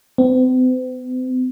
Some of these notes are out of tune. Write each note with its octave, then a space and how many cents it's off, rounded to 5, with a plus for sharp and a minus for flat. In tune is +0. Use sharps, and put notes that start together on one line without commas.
C4 -45